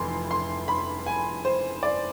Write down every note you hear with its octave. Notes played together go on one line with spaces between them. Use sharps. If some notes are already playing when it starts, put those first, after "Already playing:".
Already playing: F1 F2 E3 C6
C6
B5
G#5
C5
D5